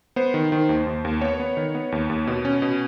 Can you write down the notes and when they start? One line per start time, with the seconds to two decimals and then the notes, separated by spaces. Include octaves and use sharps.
0.16 B3 C5
0.34 D#3
0.52 D#3
0.69 D#2
0.87 D#2
1.05 D#2
1.21 B3 C#5
1.40 B3
1.57 D#3
1.75 B3
1.92 D#2
2.10 D#2
2.27 B2
2.45 C#4
2.62 B2